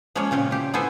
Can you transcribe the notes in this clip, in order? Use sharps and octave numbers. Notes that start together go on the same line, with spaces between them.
F3 G#3 A#3 C#4 C#5
A#2 C#3 C4 C#4
A2 G4
B3 E4 A4 C5 G#5